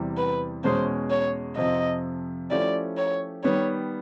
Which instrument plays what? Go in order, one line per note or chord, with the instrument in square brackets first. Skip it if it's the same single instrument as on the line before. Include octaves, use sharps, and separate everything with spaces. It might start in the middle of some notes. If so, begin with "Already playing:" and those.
Already playing: [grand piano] E2 C3 E3 G3
[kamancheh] B4
[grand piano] E2 B2 G#3 C#4 [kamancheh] C5
[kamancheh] C#5
[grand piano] F2 C3 F3 [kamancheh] D#5
[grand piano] F3 A3 C#4 E4 G4 [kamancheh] D5
[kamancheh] C#5
[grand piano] D#3 G3 B3 [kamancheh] C#5